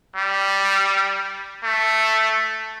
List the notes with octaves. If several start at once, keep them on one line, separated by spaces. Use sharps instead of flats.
G3
A3